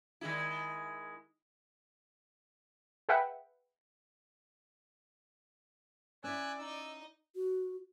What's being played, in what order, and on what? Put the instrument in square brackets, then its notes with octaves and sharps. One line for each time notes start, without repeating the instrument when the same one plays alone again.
[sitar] D#3 G#3 E4
[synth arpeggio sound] G#4 B4 E5 F#5 G5
[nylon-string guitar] C#4 E4 [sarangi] D5 [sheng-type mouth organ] G#5 E6 F#6
[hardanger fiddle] D#4 D#5 [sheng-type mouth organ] E6
[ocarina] F#4